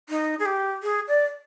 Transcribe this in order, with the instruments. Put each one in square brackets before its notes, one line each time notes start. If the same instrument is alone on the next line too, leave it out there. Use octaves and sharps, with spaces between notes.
[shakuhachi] D#4
G#4
G4
G#4
D5